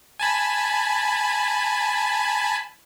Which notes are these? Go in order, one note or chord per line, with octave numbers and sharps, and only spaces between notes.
G#5 A5 B5